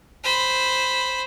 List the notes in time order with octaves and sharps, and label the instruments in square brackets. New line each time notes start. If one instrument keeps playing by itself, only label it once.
[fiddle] C5 B5